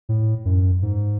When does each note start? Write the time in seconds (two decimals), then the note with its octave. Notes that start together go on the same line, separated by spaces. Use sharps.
0.09 A2
0.45 F#2
0.82 G#2